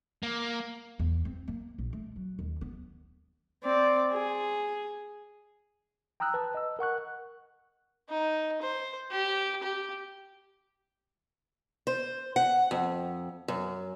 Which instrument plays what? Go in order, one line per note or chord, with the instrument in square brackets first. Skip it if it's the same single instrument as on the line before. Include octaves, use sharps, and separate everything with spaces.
[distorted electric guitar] A#3
[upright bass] E2
C4
A#3
A#1
A3
F#3
D#2
B3
[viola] C4 D5
G#4
[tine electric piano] G5 A#5 D#6 E6 F#6
B4 A5
D#5 E6
A#4 F#5 C#6 F#6
[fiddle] D#4
C5
G4
G4
[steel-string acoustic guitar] C5
F#5
F2
F#2